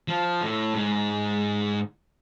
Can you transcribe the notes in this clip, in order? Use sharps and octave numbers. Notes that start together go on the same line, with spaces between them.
F3
A2
G#2